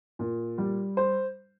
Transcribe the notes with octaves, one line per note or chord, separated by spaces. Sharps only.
A#2
G3
C5